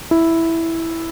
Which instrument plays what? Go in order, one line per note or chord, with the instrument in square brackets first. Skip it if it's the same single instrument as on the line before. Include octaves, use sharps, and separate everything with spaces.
[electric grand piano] E4